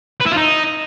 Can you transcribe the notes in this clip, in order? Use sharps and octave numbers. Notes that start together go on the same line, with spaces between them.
B4
E4
F4
D#4